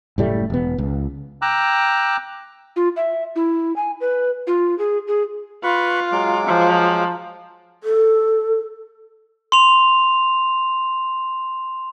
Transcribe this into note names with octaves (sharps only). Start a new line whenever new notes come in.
F#1 A2 G3 A3
E1 B3
C#2
G5 A#5 D6 E6 F#6
F4
E5
E4
G#5
B4
F4
G#4
G#4
F4 B4 B5 C#6
F#3 G#3 D6
F3
A4
C6 F7